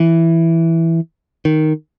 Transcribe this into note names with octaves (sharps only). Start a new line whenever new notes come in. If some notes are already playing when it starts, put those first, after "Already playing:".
Already playing: E3
D#3